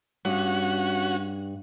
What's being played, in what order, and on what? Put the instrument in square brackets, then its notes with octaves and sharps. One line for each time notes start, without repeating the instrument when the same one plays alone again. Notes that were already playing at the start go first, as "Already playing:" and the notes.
[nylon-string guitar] G2 [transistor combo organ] C#4 F#4 F#5